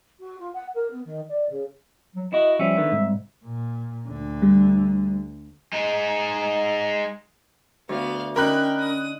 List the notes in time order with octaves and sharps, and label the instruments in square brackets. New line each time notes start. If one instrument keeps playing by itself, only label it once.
[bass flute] F#4
F4
F#5
A#4
B3
D#3
D5
C#3
[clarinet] F#3
[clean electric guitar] E4 F#4 [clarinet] D#5
[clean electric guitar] F3 G3 C#4 [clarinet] E5
[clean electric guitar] D3 D#3 B3
C2 G#2
[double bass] A#2
D2 D3
[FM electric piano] G3
[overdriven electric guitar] G#3 D#4
[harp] D2 [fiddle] B3 F5
[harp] D3 D#4 [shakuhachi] C#4 [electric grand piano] A#4 B5 F#6 [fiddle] G5
[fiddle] D#6